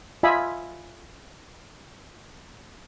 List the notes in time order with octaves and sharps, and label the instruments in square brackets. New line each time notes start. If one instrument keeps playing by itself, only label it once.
[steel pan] F4 D#5 E5 G#5 B5